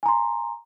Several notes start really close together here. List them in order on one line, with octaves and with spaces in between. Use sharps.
G#5 A#5 C6